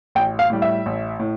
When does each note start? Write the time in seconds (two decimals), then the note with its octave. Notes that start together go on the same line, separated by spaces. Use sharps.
0.15 A1 G5
0.39 F5
0.50 A2 G3
0.62 E5
0.86 A1
1.19 A2